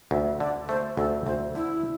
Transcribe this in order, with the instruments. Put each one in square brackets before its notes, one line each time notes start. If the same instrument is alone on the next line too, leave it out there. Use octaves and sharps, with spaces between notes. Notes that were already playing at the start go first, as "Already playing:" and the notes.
[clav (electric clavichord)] D2 [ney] E5
[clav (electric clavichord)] D3 [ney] D5
[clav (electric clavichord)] A3 [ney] C5
[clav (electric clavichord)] D2 [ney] A4
[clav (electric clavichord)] D2 [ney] C5
[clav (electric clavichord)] D3 [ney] E4